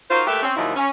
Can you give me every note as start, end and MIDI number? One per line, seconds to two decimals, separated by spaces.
0.10 0.23 63
0.10 0.23 65
0.10 0.23 66
0.10 0.23 70
0.10 0.23 72
0.27 0.41 57
0.27 0.41 58
0.27 0.41 67
0.27 0.41 71
0.27 0.41 76
0.42 0.53 60
0.42 0.53 61
0.56 0.75 39
0.56 0.75 46
0.56 0.75 51
0.56 0.75 53
0.56 0.75 54
0.56 0.75 64
0.76 0.90 61